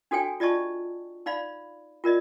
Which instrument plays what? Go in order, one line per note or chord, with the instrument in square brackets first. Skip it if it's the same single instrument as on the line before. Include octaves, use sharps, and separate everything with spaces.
[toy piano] D4 F#4 A4 C#5 G5 G#5
F4 D5 D#5 A5 C#6
D#4 D5 F5 B5
F4 A#4 D5 D#5